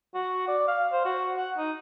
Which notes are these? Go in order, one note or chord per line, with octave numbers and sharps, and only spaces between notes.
F#4
D5
F5
C5
F#4
F#5
D#4